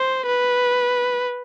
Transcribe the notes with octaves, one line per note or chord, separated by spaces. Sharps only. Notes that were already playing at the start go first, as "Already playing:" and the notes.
Already playing: C5
B4